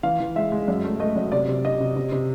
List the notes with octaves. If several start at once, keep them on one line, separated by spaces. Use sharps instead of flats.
E3 F5
E3
G#3 E5
G#3
F#2
A3
A3 D#5
F#2
C3 D5
C3
C3 D#5
C3
C3
C3